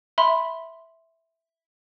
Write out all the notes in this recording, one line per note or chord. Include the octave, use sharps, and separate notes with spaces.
E5 B5 C6